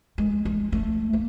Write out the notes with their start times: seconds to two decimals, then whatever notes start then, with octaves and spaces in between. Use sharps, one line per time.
0.18 G#3
0.45 G#3
0.72 A3
1.13 A#3